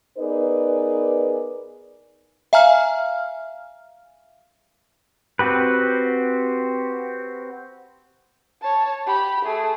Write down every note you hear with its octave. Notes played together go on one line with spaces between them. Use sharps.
B3 D#4 G#4 A#4 B4 D5
E5 F5 G#5 A#5 F6
C4 F#4 G4 B4
C#5 A5
G4 B5
A3 G#4